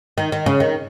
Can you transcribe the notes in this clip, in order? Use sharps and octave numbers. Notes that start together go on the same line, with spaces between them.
D#3
D#3
C#3
D#3